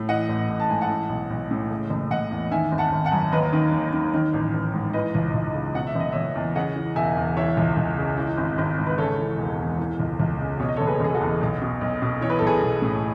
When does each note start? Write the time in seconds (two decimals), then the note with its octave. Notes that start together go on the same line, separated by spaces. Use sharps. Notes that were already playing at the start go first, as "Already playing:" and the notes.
Already playing: A2
0.09 E3 D#5 F#5
0.29 A1
0.49 A1
0.60 A5
0.70 G#2 G#5
0.81 F#5 A5
0.90 E3
1.09 B1
1.30 B1
1.51 A2
1.71 C#3
1.90 F#1
2.11 F#1 D#5 F#5
2.31 E2
2.51 D#3 E5 G#5
2.72 G#1
2.78 F#5 A5
2.92 G#1
3.05 F#5 A5
3.12 F#2
3.32 D#2 B4 D#5
3.53 D#3
3.72 D#2
3.93 D#3
4.14 D#3
4.34 A1
4.54 A1
4.73 G#2
4.93 E3 B4 D#5
5.15 C#2
5.34 C#2
5.55 C#3
5.75 B2 F#5
5.87 E5
5.95 F#1 D#5
6.12 F#1 C#5 E5
6.36 E2
6.55 C#3 D#5 F#5
6.76 E3
6.96 E1 E5 G#5
7.17 E2
7.37 E3 C#5 E5
7.57 C#2
7.77 C#2
7.98 C#3
8.17 E3
8.37 G#1
8.58 G#1
8.78 G#2
8.87 B4
8.98 C#3 A4 C#5
9.18 E3
9.38 E1
9.59 E2
9.79 E3
10.00 C#2
10.20 C#2
10.39 C#3
10.60 B2 C#5
10.68 D#5
10.76 A4 C#5
10.81 F#1
10.87 G#4 B4
11.00 F#1 G#4
11.14 F#4 A4
11.21 E2
11.41 B1
11.62 B2
11.81 B1
12.02 B2
12.21 E3 C#5
12.30 B4
12.39 B1 A4
12.47 G#4 B4
12.62 B1
12.82 A2